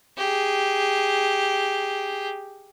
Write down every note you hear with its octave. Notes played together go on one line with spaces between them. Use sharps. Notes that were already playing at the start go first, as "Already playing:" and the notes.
G4 G#4